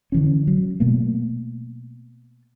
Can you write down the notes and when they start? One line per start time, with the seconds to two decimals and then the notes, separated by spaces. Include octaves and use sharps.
0.12 D3 E3 C#4
0.47 F#3
0.80 B2 A3 A#3